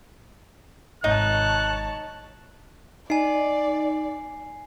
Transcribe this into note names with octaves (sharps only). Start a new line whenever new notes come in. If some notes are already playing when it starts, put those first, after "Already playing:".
G#1 C3 D#4 C#5 A5 F#6
D#4 D5 G#5 C7